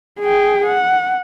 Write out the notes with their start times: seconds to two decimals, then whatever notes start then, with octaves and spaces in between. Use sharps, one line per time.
0.20 G#4 G5
0.66 F#5